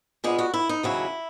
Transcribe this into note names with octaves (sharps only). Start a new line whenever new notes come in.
A#2 G#3 B3 G#4
F#4
E4
D#4
D#2 C#3 F#3 C#4 E4